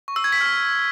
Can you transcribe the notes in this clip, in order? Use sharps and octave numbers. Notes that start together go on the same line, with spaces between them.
C#6
E6
G#6
B6
F6